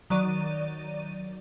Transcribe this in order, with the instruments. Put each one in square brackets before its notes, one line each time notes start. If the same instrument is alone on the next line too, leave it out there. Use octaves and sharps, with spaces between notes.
[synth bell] D#3 F#3 D5 D#7